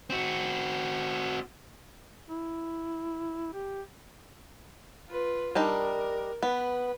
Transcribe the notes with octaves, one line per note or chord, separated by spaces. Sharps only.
C4 F#4
E4
G4
F4 B4
G3 D4 D#4 A#4
B3 B4